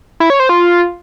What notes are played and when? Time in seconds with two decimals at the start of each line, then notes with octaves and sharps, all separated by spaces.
0.20 E4
0.30 C#5
0.40 C5
0.49 F4